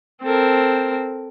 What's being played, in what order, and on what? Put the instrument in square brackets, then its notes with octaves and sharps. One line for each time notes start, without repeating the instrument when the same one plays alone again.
[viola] C4 [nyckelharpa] A4 A#4